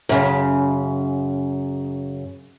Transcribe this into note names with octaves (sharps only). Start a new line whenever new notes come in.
F#2 C#3